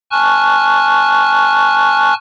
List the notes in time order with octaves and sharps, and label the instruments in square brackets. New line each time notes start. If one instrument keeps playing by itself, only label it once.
[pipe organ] G#5 A5 C#6 F6 F#6